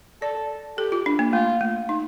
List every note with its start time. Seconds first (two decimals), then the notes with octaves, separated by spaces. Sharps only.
0.22 A4 D5
0.77 G4 A4
0.92 F4
1.06 D4
1.19 A#3
1.33 A3 F4
1.61 A3
1.89 D#4